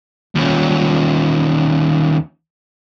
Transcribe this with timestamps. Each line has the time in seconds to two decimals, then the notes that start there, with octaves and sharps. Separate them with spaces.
0.35 D#2 C#4